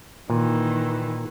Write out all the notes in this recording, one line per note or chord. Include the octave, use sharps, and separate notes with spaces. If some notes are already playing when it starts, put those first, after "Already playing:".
A#2 D#3 E3